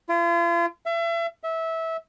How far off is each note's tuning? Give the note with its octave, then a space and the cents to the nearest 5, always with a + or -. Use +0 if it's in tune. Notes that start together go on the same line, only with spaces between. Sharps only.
F4 -40
E5 +35
E5 -20